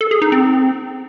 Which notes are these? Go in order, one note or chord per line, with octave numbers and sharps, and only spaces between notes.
A4
G#4
D#4
C4